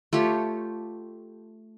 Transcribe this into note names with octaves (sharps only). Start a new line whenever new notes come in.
A3 F4 G4 C#5